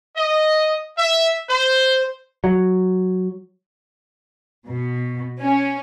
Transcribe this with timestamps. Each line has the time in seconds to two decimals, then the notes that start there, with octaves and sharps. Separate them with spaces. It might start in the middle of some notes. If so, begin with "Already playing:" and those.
0.17 D#5
0.98 E5
1.50 C5
2.44 F#3
4.66 B2
5.42 C#4